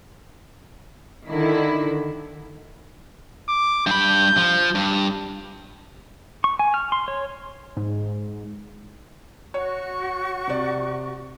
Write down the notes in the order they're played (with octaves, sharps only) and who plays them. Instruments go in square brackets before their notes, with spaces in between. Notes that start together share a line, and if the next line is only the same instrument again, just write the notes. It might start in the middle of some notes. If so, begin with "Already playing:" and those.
[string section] D3 D#3 E4
[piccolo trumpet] D6
[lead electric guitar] G2 B5 [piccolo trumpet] G6
[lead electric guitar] F3
G2
[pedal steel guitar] C#6
G#5
F6
C6
C#5
[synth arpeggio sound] G#2
[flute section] F#4 C#6 [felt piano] C#5
[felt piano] C3 D5